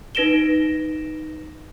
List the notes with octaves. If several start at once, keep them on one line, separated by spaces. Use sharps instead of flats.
D#4 B4 A#6 D7 E7 G7